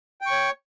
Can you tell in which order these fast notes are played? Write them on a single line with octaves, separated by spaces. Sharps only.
G5 C#6 C#5